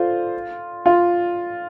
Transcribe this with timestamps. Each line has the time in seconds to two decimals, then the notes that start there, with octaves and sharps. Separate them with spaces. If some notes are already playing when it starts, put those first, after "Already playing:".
Already playing: F4 A4 C5 D5
0.86 F4